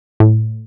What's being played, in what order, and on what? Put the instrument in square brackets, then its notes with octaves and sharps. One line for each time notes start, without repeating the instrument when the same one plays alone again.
[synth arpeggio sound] A2